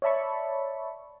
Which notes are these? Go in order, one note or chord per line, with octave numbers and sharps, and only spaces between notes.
C#5 D5 E5 A5 B5 C#6